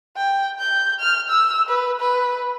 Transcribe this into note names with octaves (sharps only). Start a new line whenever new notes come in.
G5
G6
F6
E6
B4
B4